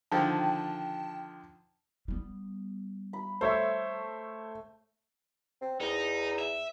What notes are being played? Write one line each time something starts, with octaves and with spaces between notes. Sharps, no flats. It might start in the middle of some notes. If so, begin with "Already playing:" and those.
D3 D#3 F3 G5 A5
G3 B3
B5
A3 C5 C#5 E5
C4
E2 D#4
E5